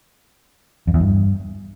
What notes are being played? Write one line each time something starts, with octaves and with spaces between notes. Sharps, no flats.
F2
E2
G2